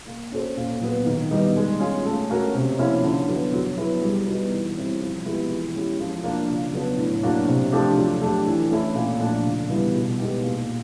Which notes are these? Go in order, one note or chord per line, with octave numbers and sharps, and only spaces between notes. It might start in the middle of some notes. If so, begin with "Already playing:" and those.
A#3
C#4 F#4 A4 C5
A#2
F#3 B3
D#3
G3 B3 D#4
G#3
C#4 F4 G#4
A3
C#4 F#4 A#4
C3
F3 A#3 C#4 E4
D3
F#3 B3
F#3
B3 E4 G#4 B4
G3
B3 D#4 F#4 B4
E3
G3 C4 E4
F3
G#3 B3 E4 G4
E3
G#3 C#4 E4 G4
F3
A#3 D4
C#3
F#3 B3 D4
A2
F#3 A#3 D4 F#4
C3
F3 A3 D4 G4
F#3
A3 D4 G4
E3
A3 C#4 E4
A#2
F3 A3 D4
C#3
E3 G3 B3 E4
B2
G#3 B3 D#4 G4
A#2